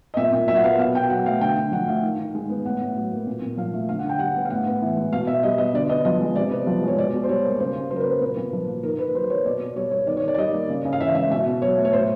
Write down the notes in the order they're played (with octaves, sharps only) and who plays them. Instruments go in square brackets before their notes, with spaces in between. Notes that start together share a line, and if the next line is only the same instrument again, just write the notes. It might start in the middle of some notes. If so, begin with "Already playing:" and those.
[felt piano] D#5
A#2 E5
A#2
F#3 E5
F#5
B3 F5
B2 F5
B2 G5
F#3 F#5
A3 F5
D3 G5
D3
F3 F#5
A3 F5
D#3
D#3
G#3
B3
A2 F#5
A2
F#3
A#3
A#2
A#2
F3 F5
A3
D3 F5
F#5
D3
G5
G3 F#5
B3
F5
A2 F#5
B3
E3
G#3
B2 F5
B2 E5
G3 D#5
B3 D#5
D3 D5
B3 D#5
F3 D#5
G#3
C3 D5
B3
F3
G#3 C#5
B2 D5
B2
C5
G3 C#5
A#3
C#3 C5
C#3
F#3 C5
A#4
B4
A#3 C5
A#2 B4
A#2
F3
A#3
D#3 A#4
D#3 B4
F#3 C5
A#3 C#5
B2 D5
B2
G3 C#5
B3 C#5
D#3 D5
C#5
D#3 D5
D5
G3 D#5
A#3
C#3
C#3
F5
E3 E5
G#3 E5
B2 E5
B2
F#3 C#5
A3
C#5
A2 C5